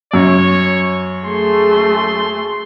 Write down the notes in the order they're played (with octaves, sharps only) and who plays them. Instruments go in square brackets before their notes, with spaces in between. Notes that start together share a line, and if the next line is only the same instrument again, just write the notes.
[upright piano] F#2 [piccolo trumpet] C#5
[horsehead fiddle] A3 G#4 [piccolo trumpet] C6